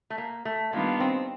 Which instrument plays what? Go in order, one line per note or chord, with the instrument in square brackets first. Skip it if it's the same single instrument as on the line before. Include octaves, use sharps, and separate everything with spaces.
[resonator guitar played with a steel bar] A3
A#3
A3
[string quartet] D#3 G3 B3 D4 F4 [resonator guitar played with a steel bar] A#3
[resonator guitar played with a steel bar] C4